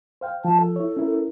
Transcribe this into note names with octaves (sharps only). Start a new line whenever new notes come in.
C5 F5 G5
F3 A5
A4
E4 C#5
C#4 E4 A#4